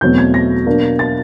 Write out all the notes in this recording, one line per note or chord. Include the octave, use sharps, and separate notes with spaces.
E2 B2 F#3 A3 C4 G6
G#6
A#6
B2 F#3 A#3 D4
A6